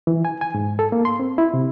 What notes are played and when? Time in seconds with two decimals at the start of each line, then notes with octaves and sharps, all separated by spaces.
0.07 E3
0.25 G#5
0.41 G#5
0.55 G#2
0.79 A4
0.92 A#3
1.05 C6
1.20 C4
1.38 E4
1.54 C3